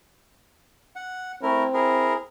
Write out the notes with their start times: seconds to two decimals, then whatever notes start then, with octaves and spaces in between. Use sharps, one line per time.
0.96 F#5
1.43 A3 C4 E4 A#4
1.74 E4 G#4 A#4